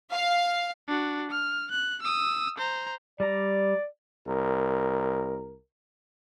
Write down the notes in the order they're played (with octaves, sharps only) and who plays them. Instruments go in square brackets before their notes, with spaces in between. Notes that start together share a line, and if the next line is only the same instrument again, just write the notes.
[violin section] F5
[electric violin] D4 F#4
F6
F#6
D#6 E6
C5 A#5
[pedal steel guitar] G3 A#5 [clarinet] D5
[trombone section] C2 A#4